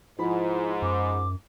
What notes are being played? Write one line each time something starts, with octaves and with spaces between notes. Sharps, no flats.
G#2 F3 E4 B5
F#2 D6